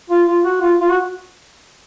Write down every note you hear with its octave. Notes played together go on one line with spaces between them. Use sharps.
F4
F4
F#4
F4
F4
F#4